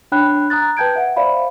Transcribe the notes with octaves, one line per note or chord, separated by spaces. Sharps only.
D4 C#5 G5 B5 F#6
A#5 D#6 F#6 A6
B4 G5 A5 G6 G#6 D7
E5 F#5
C5 D5 E5 F5 B5